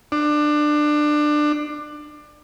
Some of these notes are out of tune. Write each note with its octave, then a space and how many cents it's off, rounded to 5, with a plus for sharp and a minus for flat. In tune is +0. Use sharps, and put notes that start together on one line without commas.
D4 +20